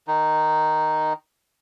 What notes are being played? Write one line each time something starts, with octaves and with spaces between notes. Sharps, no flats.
D#3 D#4